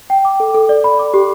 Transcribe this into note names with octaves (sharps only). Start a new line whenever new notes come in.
G5
D6
A4
A4
D5
B5
D6
G4